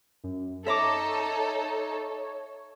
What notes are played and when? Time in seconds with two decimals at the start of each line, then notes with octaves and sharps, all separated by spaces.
0.24 F#2
0.66 D#4 A4 C#5 E5 A#5 D6